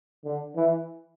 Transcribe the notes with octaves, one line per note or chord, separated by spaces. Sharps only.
D3
E3